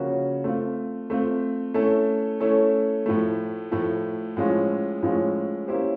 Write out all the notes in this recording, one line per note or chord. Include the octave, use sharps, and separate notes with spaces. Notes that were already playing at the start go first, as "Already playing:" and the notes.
Already playing: C#3 F3 A#3 C#4 F#4
A3 C4 F4
A3 C4 F4
A3 C#4 E4 A4
A3 C#4 E4 A4
A2 F3 A3
A2 F3 A3
A2 F3 G#3 C#4 F4
A2 F3 G#3 C#4 F4
A#3 C#4 E4 G4 C5